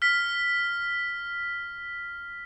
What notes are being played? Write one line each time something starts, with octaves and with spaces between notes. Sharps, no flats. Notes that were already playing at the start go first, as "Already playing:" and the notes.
F6 B6